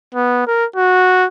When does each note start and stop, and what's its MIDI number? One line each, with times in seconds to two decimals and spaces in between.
0.15 0.43 59
0.47 0.65 70
0.76 1.26 66